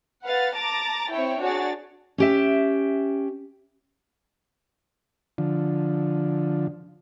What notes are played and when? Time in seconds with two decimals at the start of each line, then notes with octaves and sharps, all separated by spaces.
0.24 B4 F5 F#5 A6
0.55 A5 A#5 D6 A6
1.11 C4 E4 C#5 G5
1.42 D4 F#4 G#4 C#5 D5 A6
2.18 C#4 G4 E5
5.38 D3 F3